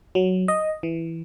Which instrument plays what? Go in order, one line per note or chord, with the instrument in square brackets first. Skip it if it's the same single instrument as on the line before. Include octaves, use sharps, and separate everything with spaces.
[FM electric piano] F#3
D#5
E3